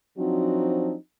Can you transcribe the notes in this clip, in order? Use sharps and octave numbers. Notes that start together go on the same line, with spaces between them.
F3 F#3 C4 D4 D#4 F#4